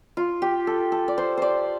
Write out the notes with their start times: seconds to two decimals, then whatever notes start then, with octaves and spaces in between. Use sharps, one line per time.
0.17 F4
0.42 G4
0.67 A4
0.92 A4
1.08 D5
1.18 C5
1.37 C5 D5